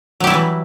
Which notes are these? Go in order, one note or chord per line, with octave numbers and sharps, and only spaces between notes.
E3 F#3 G3 E4 G4